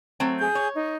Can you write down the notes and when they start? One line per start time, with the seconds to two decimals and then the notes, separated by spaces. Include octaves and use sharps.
0.20 F#3 A3 C4
0.40 G#4 G6
0.55 C#5
0.74 D#4